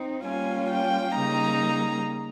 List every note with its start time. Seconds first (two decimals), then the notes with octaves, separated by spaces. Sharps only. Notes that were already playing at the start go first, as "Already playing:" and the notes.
Already playing: C4 D#4
0.25 G3 A#3 C#4 F4 G#5
0.70 G5
1.15 C#3 G3 A#3 D#4 A#5